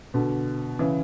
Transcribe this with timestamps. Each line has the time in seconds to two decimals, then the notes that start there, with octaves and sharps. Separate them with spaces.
0.14 B2 D3
0.79 C#3 E3